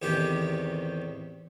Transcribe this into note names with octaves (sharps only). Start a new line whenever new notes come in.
A1 E2 C3 D#3 G4 G5